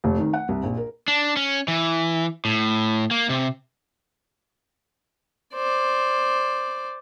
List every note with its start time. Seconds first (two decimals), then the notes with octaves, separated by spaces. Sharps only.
0.04 F1
0.18 D#3
0.33 F#5
0.49 C2
0.63 A#1
0.77 A#4
1.08 D4
1.37 C#4
1.68 E3
2.45 A2
3.11 A#3
3.30 C3
5.55 C5 D5